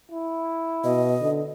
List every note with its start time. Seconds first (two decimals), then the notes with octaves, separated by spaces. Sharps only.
0.11 E4
0.84 B2 D#5
1.21 D3